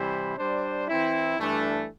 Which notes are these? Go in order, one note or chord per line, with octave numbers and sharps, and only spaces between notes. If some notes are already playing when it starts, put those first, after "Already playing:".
Already playing: C3 E3 G3 E4 C5
G3 D4 C5
E3 C4 E4
G2 E3 A3 D4